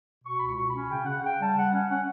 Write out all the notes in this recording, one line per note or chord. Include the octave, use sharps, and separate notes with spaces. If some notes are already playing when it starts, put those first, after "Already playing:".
B2 C#6
C#2 B5
C#6
B2
B5
C#4
C#3 G5
C#3 F#5
C#3 G5
G3 A5
G3 F#5
C#4 F#5
C#4 F#5